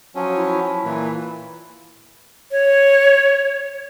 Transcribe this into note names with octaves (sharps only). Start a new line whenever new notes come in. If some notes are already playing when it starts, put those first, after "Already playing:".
F3 F#3 C#4
E4
A#2 E3
C#5